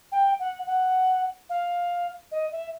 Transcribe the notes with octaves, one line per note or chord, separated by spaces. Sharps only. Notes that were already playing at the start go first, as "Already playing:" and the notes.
G5
F#5
F#5
F5
D#5
E5